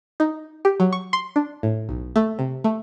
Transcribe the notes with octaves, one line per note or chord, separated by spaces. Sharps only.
D#4
G4
F#3
C#6
C6
D4
A2
B1
A3
C3
A3